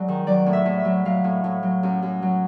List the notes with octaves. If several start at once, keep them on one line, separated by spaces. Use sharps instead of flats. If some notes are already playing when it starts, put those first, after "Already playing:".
Already playing: G#2 F#3 D5
D#3
F#3 D5
A2
E5
A2
E5
F#3
F#3 F5
A2
A2
F#3
F#2
F#2
F#3